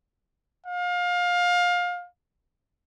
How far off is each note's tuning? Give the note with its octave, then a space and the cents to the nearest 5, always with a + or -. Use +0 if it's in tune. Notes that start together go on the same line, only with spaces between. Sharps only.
F5 +25